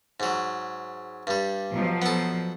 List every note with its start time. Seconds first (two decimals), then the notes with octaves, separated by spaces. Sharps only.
0.20 G#2 F#3
1.27 G2 G3
1.72 B2 F3 F#3
2.02 B3 A4